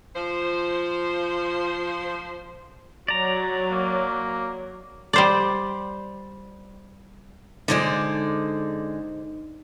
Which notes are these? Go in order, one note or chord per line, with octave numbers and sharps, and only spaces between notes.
F3 C5
F#3 D5 A#5
A#3
G3 C5 D5
D3 G#3 D#4 C5 D5